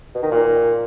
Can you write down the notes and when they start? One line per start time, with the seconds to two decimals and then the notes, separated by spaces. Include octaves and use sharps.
0.15 B2
0.23 D#3
0.31 A#2